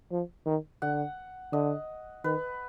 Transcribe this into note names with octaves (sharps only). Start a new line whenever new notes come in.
F3
D#3
D3 F#5
D3 D#5
D#3 B4